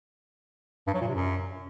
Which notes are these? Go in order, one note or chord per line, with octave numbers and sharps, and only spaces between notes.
G2
F#3
A#2
C3
F#2